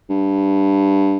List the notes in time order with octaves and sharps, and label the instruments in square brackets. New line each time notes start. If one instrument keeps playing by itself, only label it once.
[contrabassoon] G2